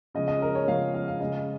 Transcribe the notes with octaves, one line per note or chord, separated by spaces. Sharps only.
C#3 F3 G#3 D#5
D#5
A#4
C#5
C#3 F3 G#3 F5
F5
F5
C#3 G#3 D#5